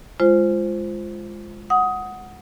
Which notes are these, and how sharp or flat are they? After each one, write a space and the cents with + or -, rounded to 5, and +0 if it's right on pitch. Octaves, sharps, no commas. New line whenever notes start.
G#3 +0 F4 -15 C5 +0
F#5 +0 D#6 +15